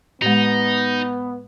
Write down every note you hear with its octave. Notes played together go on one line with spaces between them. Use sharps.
A2 G#3 B3 D#4